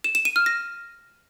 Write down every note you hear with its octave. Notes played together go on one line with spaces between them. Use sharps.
E7
E7
D#7
F6
A#6